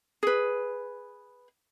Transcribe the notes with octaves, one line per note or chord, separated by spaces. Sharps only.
G#4 B4